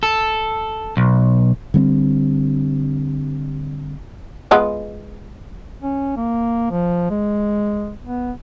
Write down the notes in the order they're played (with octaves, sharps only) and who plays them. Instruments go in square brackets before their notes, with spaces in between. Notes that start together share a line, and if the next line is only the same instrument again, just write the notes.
[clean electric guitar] A4
B1
[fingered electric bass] D3 G3 B3 C4
[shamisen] G#3 B3 F4
[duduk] C#4
A#3
F3
G#3
B3